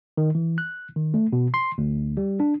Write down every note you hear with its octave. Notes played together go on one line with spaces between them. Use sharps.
D#3
E3
F#6
D#3
A3
B2
C6
D2
G3
D4